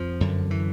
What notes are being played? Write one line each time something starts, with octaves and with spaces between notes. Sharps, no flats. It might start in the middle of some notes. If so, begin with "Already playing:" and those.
Already playing: F2 F3
F#2 D3
E3